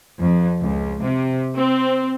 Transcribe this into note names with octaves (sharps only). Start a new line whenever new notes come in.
F2
C#2
C3
C4